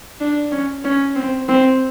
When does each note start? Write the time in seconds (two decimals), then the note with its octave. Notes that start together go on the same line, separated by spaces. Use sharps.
0.21 D4
0.51 C#4
0.84 C#4
1.16 C4
1.48 C4